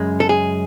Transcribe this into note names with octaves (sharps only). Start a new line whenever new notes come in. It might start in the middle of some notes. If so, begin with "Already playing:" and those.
Already playing: F#2 C#3 G#3
A4
G#4